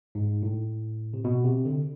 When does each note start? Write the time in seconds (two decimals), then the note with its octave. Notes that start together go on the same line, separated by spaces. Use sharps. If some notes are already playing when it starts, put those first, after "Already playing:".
0.15 G#2
0.43 A2
1.14 C3
1.25 B2
1.44 C3
1.65 D3